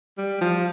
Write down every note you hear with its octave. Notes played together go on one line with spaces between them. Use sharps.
G3
F3